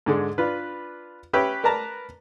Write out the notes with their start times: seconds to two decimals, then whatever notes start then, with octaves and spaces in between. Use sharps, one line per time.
0.06 G#2 D3 G#3
0.38 D4 F4 B4
1.33 C#4 G4 B4 C#5 E5 G5
1.64 A#4 B4 D5 A5 A#5